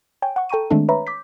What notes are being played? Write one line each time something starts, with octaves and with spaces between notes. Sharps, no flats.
C#5 G5 G#5
F#5 C#6
A4 G5 A#5 C#6 D#7
D#3 G#3 A3 C4 D4 A4
B4 C#5 E5 A#5 B5
D6 G6 B6